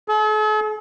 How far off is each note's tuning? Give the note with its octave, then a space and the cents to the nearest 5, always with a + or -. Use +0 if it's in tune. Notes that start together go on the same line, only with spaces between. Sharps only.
A4 -45